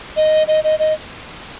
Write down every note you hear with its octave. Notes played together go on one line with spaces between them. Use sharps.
D#5
D#5
D#5
D#5